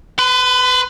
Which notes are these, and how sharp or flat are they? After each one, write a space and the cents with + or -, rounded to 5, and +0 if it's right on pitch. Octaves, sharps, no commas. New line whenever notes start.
B4 +15 C6 -45